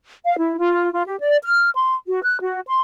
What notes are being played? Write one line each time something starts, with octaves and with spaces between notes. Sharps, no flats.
F5
E4
F4
F4
G4
D5
F6
C6
F#4
F#6
F#4
C6